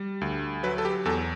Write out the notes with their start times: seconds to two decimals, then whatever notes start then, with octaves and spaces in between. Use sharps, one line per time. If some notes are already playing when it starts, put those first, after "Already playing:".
Already playing: G3
0.21 D2
0.63 F#3 B4
0.78 A4
0.85 G4
1.05 E2 A4